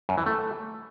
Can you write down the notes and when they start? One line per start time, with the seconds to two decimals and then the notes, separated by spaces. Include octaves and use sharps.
0.09 F#2
0.17 E3
0.26 A3